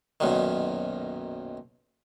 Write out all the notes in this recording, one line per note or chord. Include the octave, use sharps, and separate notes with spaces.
B1 F#2 A#2 D#3